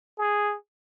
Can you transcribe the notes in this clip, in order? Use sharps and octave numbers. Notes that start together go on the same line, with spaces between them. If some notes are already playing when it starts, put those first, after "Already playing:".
G#4